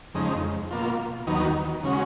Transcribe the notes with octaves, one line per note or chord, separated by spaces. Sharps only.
F2 C#3 G#3 D#4
B2 A#3 F4
D#2 D#3 F#3 B3 D#4
C#3 G#3 C#4 F#4